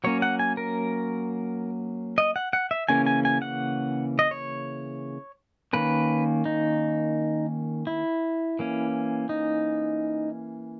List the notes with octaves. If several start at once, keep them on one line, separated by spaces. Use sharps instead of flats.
F#3 A#3 C#4 C#5
F#5
G#5
A#4
D#5
F#5
F#5
E5
C#3 E3 A#3 C#4 G#5
G#5
G#5
F#5
D#5
C#5
D#3 A#3 C#4 B4
D#4
E4
E3 A#3 C#4
D#4